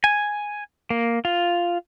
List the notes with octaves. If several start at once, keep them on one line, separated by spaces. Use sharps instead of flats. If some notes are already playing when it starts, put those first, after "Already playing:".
G#5
A#3
F4